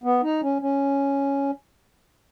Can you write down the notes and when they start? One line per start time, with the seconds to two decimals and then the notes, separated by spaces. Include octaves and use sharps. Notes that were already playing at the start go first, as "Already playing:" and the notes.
0.04 B3
0.23 D#4
0.42 C#4
0.62 C#4